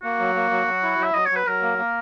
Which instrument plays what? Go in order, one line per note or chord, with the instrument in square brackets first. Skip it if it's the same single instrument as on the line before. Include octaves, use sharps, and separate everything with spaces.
[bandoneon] A#3 [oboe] F#4
[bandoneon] F#3
A#3
F#3
F#3
E4
F#3
[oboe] E5
[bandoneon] F#3 [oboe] D#5
[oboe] C#5
[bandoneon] F#3
[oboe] B4
[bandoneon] F#3 [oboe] A#4
[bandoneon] A#3
A#3